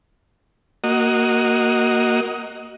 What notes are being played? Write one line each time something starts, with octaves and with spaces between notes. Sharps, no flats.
A#3 F#4 D#5